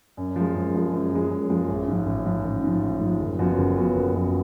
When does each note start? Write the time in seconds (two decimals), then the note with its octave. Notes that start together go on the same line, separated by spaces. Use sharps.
0.17 F#2
0.36 F3 G#3
0.55 F#2
0.74 F3 G#3
0.93 F#2
1.12 F3 G#3
1.31 F#2
1.50 F3 G#3
1.68 A1
1.88 G#2 F3
2.06 A1
2.26 G#2 F3
2.44 A1
2.64 G#2 F3
2.83 A1
3.01 G#2 F3
3.20 F#1
3.39 F#2 F3 B3 F#4
3.57 F#1
3.77 F#2 F3 B3 F#4
3.95 F#1
4.14 F#2 F3 B3 F#4